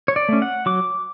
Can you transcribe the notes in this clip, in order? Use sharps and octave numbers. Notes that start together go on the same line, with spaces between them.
C#5
D5
A3 C#4
F#5
F#3 D6